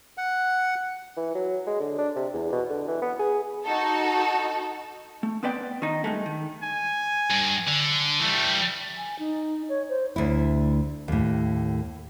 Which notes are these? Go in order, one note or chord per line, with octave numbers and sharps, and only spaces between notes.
F#5
E3
F#3
G#3
D3
D4
C3
E2
B2
D3
E3
B3
G#4
D#4 F#4 A4
A3
B3 C4 B4 D5 G5
D#3 D#4
G2 G#3 A3
D#3
G#5
G2
D3
E3 G3 A3
G#5
D#4
C#5
C5
D2 E4
D#2 A2